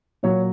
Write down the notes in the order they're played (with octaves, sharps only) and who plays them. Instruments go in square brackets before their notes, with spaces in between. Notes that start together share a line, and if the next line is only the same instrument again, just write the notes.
[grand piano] A#2 F#3 C#5